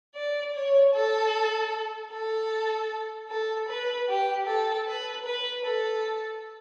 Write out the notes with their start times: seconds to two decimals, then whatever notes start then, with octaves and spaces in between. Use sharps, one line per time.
0.15 D5
0.54 C#5
0.93 A4
2.12 A4
3.29 A4
3.68 B4
4.08 G4
4.47 A4
4.87 B4
5.25 B4
5.65 A4